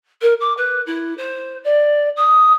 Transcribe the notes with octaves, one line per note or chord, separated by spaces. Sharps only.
A#4
D6
B4
E4
C5
D5
D#6